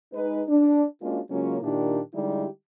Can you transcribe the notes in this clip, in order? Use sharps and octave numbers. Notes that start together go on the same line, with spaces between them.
G#3 D#4 B4
D4
G#3 A#3 C#4 D4 F4 F#4
C#3 F#3 G#3 A#3 C#4 F4
A#2 D#3 A#3 D4 E4 G4
D3 G3 G#3 D#4 E4 G4